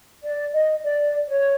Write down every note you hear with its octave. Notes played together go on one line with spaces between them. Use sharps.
D5
D#5
D5
C#5